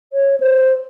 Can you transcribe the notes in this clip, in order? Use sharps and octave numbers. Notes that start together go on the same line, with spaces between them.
C#5
C5